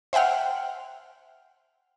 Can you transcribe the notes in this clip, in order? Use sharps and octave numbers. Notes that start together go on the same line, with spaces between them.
C5 E5 F#5 G5 F6